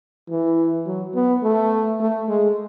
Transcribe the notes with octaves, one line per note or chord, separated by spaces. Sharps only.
E3
F#3
B3
A3
A3
G#3